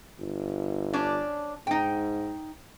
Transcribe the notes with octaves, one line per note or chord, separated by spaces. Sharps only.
G1
C#4 D4 D5
G#2 D#4 G5